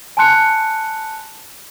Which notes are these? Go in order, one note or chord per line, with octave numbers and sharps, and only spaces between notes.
G#5 A5 C6 F#6 C#7